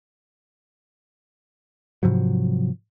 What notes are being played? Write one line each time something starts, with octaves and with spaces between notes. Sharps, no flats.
G#2 C3 F3 F#3